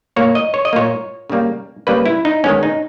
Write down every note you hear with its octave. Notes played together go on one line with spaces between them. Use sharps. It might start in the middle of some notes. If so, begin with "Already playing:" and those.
A#2 A#3 C#5
D#5
C#5
D#5
A#2 A#3 C#5
C#3 G3 A#3
C#3 G3 A#3 B4
E4
D#4
D#3 G#3 B3 C#4
D#4